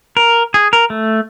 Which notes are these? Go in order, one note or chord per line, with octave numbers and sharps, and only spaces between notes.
A#4
G#4
A#4
A3